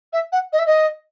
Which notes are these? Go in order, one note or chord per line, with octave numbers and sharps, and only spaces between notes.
E5
F#5
D#5
E5
D#5